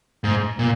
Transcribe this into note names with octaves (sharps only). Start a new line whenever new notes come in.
G#2
A#2